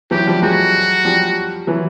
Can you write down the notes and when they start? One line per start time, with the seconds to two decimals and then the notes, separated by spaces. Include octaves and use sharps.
0.11 E3 F#3 G4
0.26 F3 G3
0.42 F#3 G#3 F#4
1.05 F3 G3
1.67 E3 F#3